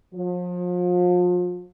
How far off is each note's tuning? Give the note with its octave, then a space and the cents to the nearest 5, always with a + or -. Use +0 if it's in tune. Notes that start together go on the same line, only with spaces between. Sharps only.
F3 +35